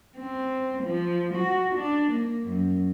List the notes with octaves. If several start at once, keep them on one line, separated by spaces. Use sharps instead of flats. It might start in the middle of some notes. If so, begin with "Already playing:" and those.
C4
F3
F#4
D4
A#3
F#2